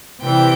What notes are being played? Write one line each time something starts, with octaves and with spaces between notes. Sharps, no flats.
C3 E3 G3 G5